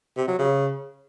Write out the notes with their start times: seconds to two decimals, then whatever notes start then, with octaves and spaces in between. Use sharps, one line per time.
0.17 C3
0.28 F#3
0.39 C#3